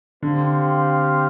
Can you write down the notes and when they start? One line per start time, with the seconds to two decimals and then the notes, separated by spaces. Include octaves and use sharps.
0.23 D3 C4 G4 C5 F5